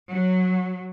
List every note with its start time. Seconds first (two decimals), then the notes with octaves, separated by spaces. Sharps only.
0.12 F#3